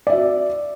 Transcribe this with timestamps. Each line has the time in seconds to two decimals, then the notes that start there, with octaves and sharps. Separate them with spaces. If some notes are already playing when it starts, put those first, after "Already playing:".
0.07 D5
0.10 E5
0.13 F#4